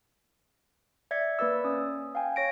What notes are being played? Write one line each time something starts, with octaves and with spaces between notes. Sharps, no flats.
D5 E5 G#6 B6 C#7
A#3 B4 D5 E6
C#4 D#6
F5 G5 G#5
C#5 A#6 D7